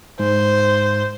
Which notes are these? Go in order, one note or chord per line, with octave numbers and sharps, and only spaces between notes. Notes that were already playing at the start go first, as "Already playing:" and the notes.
G#2 C5